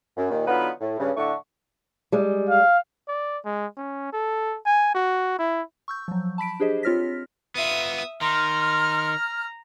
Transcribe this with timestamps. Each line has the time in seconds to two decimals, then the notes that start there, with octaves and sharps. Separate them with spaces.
0.17 F#2
0.30 D#2 A#2 D#3
0.47 D3 F#3 B3 D#4 F4 B4
0.81 A2
0.99 G2 C#3
1.17 A2 D3 A3 D4 C#6
2.12 G3 G#3
2.50 F5
3.08 D5
3.45 G#3
3.77 C#4
4.13 A4
4.66 G#5
4.95 F#4
5.39 E4
5.88 C#6 E6 G6
6.08 F3 F#3
6.38 A5 B5 B6 D7
6.60 D4 G4 G#4 C5 D#5
6.83 C4 F4 C#5 F6 A#6 B6
7.55 B3 F4 E5 D#6
8.21 D#3 A#5 C6 F6